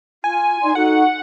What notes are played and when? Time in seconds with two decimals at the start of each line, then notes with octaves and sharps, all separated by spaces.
0.24 F4 G#5
0.63 D#4 D5 C6
0.75 D#4 F#4 A4 F#5